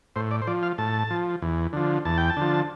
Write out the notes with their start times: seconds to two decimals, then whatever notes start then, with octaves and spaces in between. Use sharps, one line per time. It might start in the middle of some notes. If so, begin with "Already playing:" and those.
0.16 A2 C5
0.31 D5
0.42 C5
0.47 F3 D5
0.63 F5
0.78 A2 A5
1.11 F3
1.42 E2
1.73 D3 F3
2.05 E2 A5
2.18 G5
2.30 A5
2.37 D3 F3